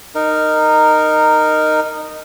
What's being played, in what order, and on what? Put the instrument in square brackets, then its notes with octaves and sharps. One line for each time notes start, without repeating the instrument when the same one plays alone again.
[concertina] D#4 A#4